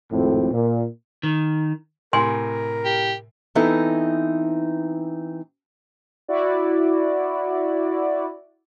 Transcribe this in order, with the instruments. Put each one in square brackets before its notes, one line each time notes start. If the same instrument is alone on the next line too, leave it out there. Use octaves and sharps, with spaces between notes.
[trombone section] G#1 F2 A2 C4
A#2
[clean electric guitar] D#3
[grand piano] A2 C3 [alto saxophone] A#4 [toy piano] G#5 C6
[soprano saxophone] G4
[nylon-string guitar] E3 B3 C4 D#4 E4 A4
[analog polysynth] E4 F#4 D5